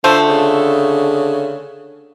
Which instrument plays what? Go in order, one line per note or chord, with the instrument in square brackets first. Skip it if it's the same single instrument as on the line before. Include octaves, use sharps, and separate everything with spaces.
[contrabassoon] D3 [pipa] F3 A3 [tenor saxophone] C5
[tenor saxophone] C#3